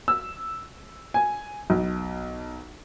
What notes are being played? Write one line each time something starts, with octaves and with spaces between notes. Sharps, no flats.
E6
G#5
B1